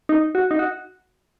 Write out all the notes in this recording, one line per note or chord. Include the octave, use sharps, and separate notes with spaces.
D#4
F#4
D#4
F#4